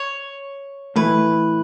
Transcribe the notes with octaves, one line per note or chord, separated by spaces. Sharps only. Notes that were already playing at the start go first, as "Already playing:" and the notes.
Already playing: C#5
A2 E3 A3 E4 B4